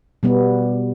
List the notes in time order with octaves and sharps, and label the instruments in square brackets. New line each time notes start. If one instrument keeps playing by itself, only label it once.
[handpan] B2 G3 B3